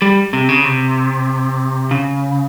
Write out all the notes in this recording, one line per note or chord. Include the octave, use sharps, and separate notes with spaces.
G3
C3
C#3
C3
C#3